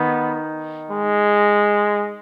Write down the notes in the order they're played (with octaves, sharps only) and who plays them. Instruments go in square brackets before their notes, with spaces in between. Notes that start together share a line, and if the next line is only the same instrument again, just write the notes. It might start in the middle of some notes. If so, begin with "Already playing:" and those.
Already playing: [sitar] D#3 [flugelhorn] B3
[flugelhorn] G#3